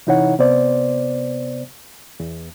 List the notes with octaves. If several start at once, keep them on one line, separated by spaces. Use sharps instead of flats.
C3 E3 D#4 E4 C#5 F#5
C3 B3 C5 D5
E2